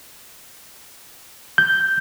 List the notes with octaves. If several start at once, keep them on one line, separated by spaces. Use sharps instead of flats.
G6